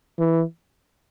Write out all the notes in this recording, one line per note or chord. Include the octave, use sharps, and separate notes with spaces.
E3